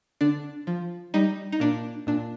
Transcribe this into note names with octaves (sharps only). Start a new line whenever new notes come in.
D3 D4
F3
G3 D#4
D#4
A#2 D4
A#2 D4